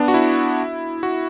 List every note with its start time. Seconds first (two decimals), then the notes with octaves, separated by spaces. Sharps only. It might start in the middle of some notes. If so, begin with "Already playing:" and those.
Already playing: B3 D4
0.08 F#4
0.14 E4
1.03 F#4